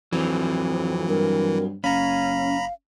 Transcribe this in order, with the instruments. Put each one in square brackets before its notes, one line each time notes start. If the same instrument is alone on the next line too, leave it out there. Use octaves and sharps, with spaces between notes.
[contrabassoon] F2 [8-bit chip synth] E3 [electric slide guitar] F#3 C4
[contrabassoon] G2 [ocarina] A#4
[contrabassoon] F#1 [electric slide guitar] C#4 [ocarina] F5 [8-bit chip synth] A#5 B5